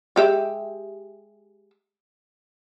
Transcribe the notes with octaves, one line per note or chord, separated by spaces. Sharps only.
G#3 G4 E5